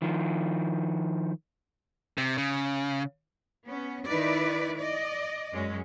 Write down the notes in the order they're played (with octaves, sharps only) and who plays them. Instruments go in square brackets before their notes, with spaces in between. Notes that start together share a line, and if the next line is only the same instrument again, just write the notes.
[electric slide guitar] D#3 F3
[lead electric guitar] C3
C#3
[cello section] B3 C#4
D#3 D#4 E4 B4 D5
D5 D#5
F#2 G#3 C#4